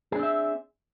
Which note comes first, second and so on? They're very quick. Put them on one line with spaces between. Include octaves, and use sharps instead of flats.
G#4 D4 C4 E5